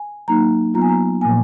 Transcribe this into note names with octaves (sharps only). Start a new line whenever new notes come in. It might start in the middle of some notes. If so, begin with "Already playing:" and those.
Already playing: G#5
F#3 A#3 D#4 A#5
F#3 B3 F4 A#5
G#5
A#5
A#2 F3 A#3 G#5